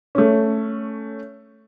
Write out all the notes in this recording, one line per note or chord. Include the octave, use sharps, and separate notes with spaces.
A3 C#4